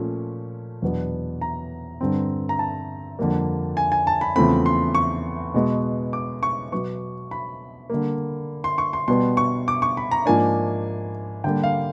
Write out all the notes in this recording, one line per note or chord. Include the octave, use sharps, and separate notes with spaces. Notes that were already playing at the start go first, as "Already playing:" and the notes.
Already playing: A#2 F3 A3 C#4
E2 B2 F#3 B3 D4
A#5
G2 D3 G3 C4
A#5
A5
F2 D3 G3 A#3
G#5
G#5
A5
B5
E2 C#3 F3 A3 C4 B5
C6
C#6
B2 G#3 B3
D6
C#6
B2 F#3 B3 C#6
B5
D3 G3 A#3
C6
C#6
C6
B2 G3 B3 C6
C#6
D6
C#6
B5
A#5
G#2 F3 A#3 D4 G#5
D3 G3 A#3 G5
F5